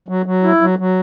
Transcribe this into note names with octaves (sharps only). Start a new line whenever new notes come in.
F#3
F#3
E4
F#3
F#3